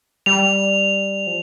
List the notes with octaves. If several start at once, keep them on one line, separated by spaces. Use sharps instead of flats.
G3 F7
F3